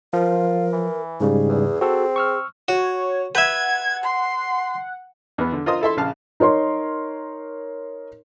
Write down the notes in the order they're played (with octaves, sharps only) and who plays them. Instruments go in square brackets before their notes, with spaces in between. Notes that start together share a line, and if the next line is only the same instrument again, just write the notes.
[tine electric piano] F3 [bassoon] F4 [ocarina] A#4
[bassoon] E3
[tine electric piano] G#2 C#3 G3 [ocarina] G#4
[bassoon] E2
[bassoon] C4 [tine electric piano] F#4 A4
[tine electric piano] C#6 E6 F6
[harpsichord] F#4 [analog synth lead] C#5
[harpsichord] B4 E5 [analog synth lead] F#5 [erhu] G#6
[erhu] C6
[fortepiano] E2 B3
D3
F4 A#4 C5 D#5 C6 D#6
E4 A4 E5 C6
A#1 C#3 F5 A5 F6
[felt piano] D#4 A#4 C#5 C6